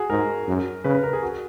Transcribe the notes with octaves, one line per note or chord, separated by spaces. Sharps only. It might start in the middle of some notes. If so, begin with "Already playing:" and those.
Already playing: F#4 G#4
G#2 A#4
F#2
C#3 B4
B4
A#4
G#4
F#4